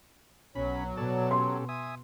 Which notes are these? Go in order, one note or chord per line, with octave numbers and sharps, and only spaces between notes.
B1 F#3 C#4 B5
B2 A4 D5 A5
C#4 G4 A4 C6
E5 G#5 D#6